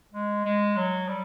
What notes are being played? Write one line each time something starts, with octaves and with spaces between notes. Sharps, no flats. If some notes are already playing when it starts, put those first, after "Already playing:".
G#3
G#3
F#3
G3